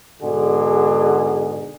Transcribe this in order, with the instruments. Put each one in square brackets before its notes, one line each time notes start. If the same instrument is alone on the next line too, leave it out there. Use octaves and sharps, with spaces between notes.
[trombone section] G#2 B2 D3 F#4 G#4